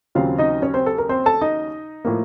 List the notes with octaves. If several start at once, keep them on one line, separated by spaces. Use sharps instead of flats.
D#2 C#3 F#3 C4 F4 F5
D#4 D#5
C#4 C#5
C4 C5
A4
A#4
C4 C5
A4 A5
D#4 D#5
A2 F3 A#3